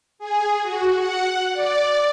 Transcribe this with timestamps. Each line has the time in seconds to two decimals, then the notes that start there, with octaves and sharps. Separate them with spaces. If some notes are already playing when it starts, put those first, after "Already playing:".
0.18 G#4
0.62 F#4
0.94 F#5
1.52 D5